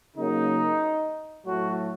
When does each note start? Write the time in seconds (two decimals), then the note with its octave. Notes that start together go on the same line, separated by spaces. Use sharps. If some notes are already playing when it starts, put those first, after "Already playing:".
0.16 C#3 F#3 A#3 D#4
1.45 A2 F#3 A3 F#4